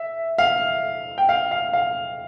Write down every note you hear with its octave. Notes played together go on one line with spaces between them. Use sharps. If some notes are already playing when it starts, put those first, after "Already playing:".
Already playing: E5
F5
G5
F5
F5
F5